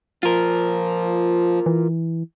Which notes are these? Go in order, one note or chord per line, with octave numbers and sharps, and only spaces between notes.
F3 F4 A#4
E3